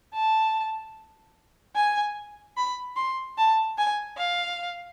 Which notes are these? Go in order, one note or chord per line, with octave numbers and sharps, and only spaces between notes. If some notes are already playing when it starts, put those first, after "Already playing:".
A5
G#5
B5
C6
A5
G#5
F5